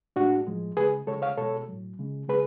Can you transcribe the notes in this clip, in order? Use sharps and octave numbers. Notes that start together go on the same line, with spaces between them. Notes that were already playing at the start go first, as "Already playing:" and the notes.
A2 G#3 D4 F#4
A2 F3 G#3
C#3 G#3 G#4 B4
C#3 G#3 A4 C#5
C#5 F5
B2 G#3 A4 C#5
A2 F#3
C#3 G#3
C#3 G#3 G#4 B4